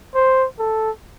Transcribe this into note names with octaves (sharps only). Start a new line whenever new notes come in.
C5
A4